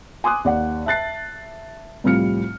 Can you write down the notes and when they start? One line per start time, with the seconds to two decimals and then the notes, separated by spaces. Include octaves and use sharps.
0.24 G#5 C6 D6 D#6 F#6
0.45 D#2 D5 F#5
0.86 E5 A5 F#6 A6 C7
2.04 C2 A2 F3 G3 F6 C#7